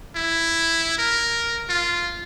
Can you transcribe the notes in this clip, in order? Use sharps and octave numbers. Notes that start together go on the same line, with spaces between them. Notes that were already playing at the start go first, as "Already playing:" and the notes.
E4
A#4
F4